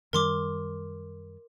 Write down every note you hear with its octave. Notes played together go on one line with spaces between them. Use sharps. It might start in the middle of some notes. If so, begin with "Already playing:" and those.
F#2 D#3 G3 A#4 C6 D6